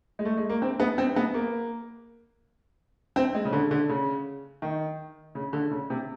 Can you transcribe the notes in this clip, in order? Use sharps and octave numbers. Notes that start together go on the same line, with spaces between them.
G#3
A3
G#3
A#3
C4
B3
C4
B3
A#3
C4
G#3
C#3
D3
D3
C#3
D#3
C#3
D3
C#3
C3